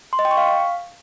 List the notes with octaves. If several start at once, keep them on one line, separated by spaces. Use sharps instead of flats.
C6
D#5
G5
C#6
F5